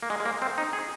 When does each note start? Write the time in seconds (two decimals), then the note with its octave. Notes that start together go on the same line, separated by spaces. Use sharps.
0.03 A#3
0.10 G#3
0.20 G#3
0.26 A#3
0.42 C4
0.58 D#4
0.73 G#4